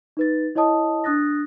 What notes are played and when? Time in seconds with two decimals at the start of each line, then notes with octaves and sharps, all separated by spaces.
0.17 D#4 B4 A6
0.55 E4 C#5 D#5 A5 D#6
1.04 D4 D#6 F#6 A6 A#6